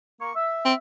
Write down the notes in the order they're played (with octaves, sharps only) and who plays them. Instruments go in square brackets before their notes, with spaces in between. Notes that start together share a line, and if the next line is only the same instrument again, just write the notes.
[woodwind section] A#3 C#6
E5
[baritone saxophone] C4